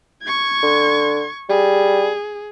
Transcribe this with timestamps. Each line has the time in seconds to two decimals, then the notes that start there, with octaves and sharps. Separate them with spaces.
0.22 C#6 G#6
0.63 D3
1.49 G3 G#4